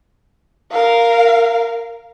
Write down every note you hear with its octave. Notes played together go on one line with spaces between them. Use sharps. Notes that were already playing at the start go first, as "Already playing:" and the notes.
A#4 F5